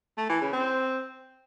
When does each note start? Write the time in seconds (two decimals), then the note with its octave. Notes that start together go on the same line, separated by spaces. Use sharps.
0.18 A3
0.29 E3
0.41 C#3
0.53 C4